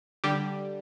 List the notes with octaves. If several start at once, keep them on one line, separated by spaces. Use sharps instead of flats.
D3 G3 G4